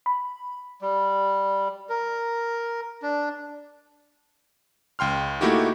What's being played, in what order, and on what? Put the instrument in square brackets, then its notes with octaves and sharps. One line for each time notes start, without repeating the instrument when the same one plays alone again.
[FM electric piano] B5
[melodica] G3
A#4
D4
[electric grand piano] C#2 G5 C6 F6
A3 A#3 D#4 E4 F#4 G4